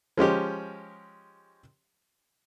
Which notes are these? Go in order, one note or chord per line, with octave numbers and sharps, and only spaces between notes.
F3 G#3 C#4 G4